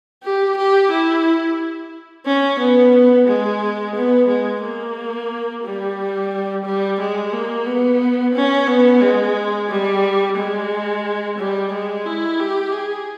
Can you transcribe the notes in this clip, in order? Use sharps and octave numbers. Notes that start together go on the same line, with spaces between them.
G4
G4
E4
C#4
B3
G#3
B3
G#3
A#3
G3
G3
G#3
A#3
B3
C#4
B3
G#3
G3
G#3
G3
G#3
E4
G4
G#4